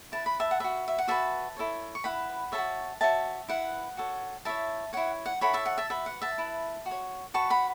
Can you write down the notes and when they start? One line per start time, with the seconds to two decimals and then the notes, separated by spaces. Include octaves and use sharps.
0.12 E4 B4 A5
0.26 B5
0.40 E5 A5
0.51 F#5
0.60 F#4 B4 E5
0.88 E5
0.99 F#5
1.08 F#4 B4 E5 A5
1.57 E4 A4 C#5
1.95 C#6
2.04 E4 B4 F#5 B5
2.52 A4 C#5 E5 A5
2.58 F#4
3.01 F#4 C#5 E5 A5
3.49 E4 B4 F#5
3.97 F#4 A4 C#5
4.45 E4 A4 C#5 E5 A5
4.93 E4 C#5 F#5
5.26 F#5
5.41 E4 A4 C#5 F#5 B5
5.54 E5 A5
5.66 F#5
5.78 E5 A5
5.90 F#4 B4 E5
6.06 F#5
6.22 E5 A5
6.38 E4 B4
6.86 F#4
6.91 C#5
7.34 F#4 B4 A5 C#6
7.50 F#5 B5